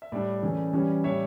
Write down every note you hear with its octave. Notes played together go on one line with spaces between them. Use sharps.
E5
A2 G3 D4 D5
C#3 E3 A3 C#4
E3 G3 C#4
A2 G3 D4 C#5 E5